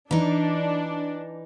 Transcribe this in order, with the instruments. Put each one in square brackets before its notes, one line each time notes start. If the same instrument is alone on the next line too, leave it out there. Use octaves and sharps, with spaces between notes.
[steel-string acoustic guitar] E3 D#4 [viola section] D4